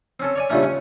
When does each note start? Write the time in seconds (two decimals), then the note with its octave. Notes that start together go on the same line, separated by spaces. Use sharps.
0.20 C4 C#4 A4
0.36 C#5 D5 G#5
0.50 C#2 G2 A#2 D3 A3 C#4
0.63 C#4